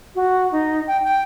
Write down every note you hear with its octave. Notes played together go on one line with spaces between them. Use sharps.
F#4
D#4
G5
G5